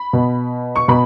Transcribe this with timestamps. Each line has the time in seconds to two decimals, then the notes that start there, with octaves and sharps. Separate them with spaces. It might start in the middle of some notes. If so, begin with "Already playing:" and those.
Already playing: B5
0.13 B2
0.76 C#6
0.88 B2 B5